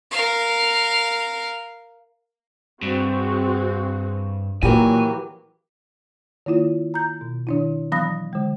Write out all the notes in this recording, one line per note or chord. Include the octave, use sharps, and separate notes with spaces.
A#4 F5
G2 C4 F#4 G#4
A#2 E3 F#3 A#3 G4 G#5
D#3 A#3 E4 F4
A#5 G6
B2
D#3 D4 E4
E3 F#3 B3 B5 D#6 A#6
D3 G#3